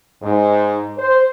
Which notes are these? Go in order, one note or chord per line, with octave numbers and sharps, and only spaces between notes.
G#2
C5